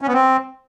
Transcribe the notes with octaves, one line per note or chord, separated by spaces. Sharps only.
C#4
B3
C4